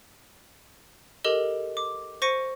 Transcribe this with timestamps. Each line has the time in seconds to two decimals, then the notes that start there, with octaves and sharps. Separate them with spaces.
1.24 G4 A4 A#4 D#5 G7
1.77 D6
2.22 C5 C#6 A#6 C#7 D#7